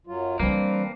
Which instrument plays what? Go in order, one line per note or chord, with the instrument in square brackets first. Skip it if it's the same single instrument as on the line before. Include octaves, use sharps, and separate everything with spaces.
[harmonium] F#2 F#3 F4
[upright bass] E3 G3 [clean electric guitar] A#3 [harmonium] C4 D4 B4